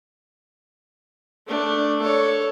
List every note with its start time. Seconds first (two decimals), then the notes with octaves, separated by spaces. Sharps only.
1.47 A3 D4
2.02 A4 C#5